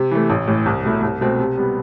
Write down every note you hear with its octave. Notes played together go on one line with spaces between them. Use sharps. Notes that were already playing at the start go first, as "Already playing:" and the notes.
Already playing: C3
E3 A3
A1
A2 E3
C2
B2 A3 E4
C2
B2 A3 C4
C3
G3 B3